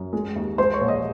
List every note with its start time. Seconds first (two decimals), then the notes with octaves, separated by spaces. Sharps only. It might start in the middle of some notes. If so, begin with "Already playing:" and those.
Already playing: F#2
0.13 G#3
0.36 D#2
0.58 G#3 C5 C6
0.74 C#5 C#6
0.81 A#1
0.88 D#5 D#6